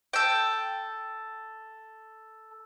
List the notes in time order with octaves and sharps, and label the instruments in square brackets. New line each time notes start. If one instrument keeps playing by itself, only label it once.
[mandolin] A4 G5